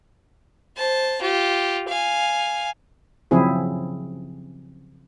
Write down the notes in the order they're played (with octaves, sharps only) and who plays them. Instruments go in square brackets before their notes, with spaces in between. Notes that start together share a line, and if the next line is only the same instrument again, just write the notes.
[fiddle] C5 A5
F4 G4
F5 G#5
[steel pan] C#3 F3 F#3 C4 E4 G#4